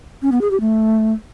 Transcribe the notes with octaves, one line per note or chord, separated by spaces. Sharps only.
C#4
B3
G#4
G4
A3